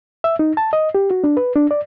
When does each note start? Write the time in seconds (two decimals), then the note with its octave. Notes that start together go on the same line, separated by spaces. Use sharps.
0.24 E5
0.39 D#4
0.57 A5
0.73 D#5
0.95 G4
1.11 F#4
1.24 D4
1.37 B4
1.56 D4
1.71 D5